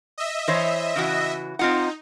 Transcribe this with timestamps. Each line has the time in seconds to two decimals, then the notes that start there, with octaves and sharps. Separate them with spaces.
0.18 D#5 E5
0.48 E3 C5 C#5
0.96 C#3 E3 F#4
1.59 C4 D#4 F4 F#5